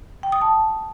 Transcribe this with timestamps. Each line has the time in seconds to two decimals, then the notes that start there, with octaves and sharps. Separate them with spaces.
0.23 G5
0.32 D#6
0.42 A5